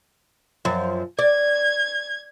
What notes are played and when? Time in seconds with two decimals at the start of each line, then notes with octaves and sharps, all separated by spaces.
0.65 F#2 F3
1.19 D5 G#6